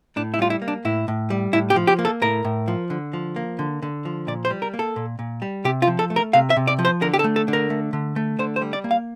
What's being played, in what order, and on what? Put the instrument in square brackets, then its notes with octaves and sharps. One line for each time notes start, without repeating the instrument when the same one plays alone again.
[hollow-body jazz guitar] A2 D4
E4
G3 F4
E4
A#3
D4
A2 E4
A2
G3
A2 E4
G4
F3
G4
A#3
A4
A2 A#4
A2
F3
D3
F3
A#3
D3
D3
F3
A#2 D5
C5
G3
A#4
A#3
A4
A#2
A#2
G3
C3 G4
F4
F3
A4
A3
A#4
C3 F5
E5
C3
D5
F3
C5
D3 A#4
G4
A4
A3
A4
D3
A#4
A3
D3
A3
D3 C5
C5
G3
D5
A#3
F5